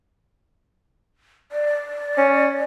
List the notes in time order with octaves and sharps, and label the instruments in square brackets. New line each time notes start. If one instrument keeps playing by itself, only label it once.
[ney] D5
[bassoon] C#4